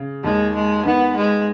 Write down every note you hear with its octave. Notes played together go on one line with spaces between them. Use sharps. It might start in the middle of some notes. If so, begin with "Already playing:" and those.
Already playing: C#3
D#2 D#3 G#3
G#3
D#3 B3 D#4
G#3